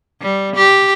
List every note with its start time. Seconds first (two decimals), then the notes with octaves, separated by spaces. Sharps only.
0.21 G3
0.56 G4